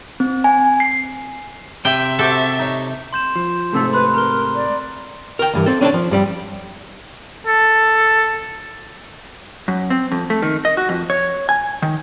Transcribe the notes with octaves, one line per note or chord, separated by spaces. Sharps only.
C4
G#5
C7
C3 E5 G5
F#4 G4 A4 C5
D#4 C#5
C6 G6 E7
F3
G#2 C3 A3 A4
B4 B5 C6 F#6
A#4 A#5 G7
D5
A#4 G5
D2 G2 E3
C4 A4
C#4 D4 A4 A5
F3
G2 G3 G4
A4
F#2
C4
F2
A3
D#3
D#5
F#4
F2
C#5
G#5
D#3